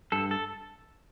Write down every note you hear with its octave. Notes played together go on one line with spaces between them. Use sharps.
G2 A4
A4